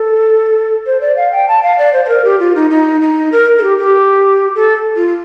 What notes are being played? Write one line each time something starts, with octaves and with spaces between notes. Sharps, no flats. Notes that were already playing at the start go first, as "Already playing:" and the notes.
Already playing: A4
C5
D5
F5
G5
A5
F5
D5
C5
C5
A#4
G4
F4
D#4
D#4
D#4
A#4
A4
G4
G4
A4
F4